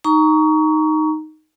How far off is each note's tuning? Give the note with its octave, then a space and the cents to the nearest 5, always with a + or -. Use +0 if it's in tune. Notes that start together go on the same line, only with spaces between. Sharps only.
D#4 +0 A#5 +0 C#6 +25